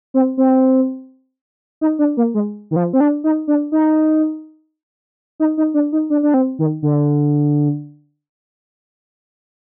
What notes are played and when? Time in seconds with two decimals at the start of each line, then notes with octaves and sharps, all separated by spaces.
0.14 C4
0.37 C4
1.81 D#4
1.99 D4
2.17 A#3
2.34 G#3
2.71 D#3
2.76 F3
2.93 C4
3.00 D4
3.24 D#4
3.48 D4
3.72 D#4
5.40 D#4
5.57 D#4
5.74 D4
5.92 D#4
6.10 D4
6.23 D4
6.34 C4
6.59 D#3
6.82 D3